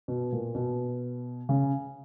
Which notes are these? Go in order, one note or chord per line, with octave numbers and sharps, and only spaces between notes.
B2
A#2
B2
C#3